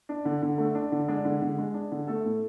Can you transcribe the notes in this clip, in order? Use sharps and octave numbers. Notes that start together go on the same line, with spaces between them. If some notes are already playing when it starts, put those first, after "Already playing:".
D4
D3
D3
A3
D4
D3
G#3 D4 G#4
D3
D3
G#3
D4
D3
A3 A4
A2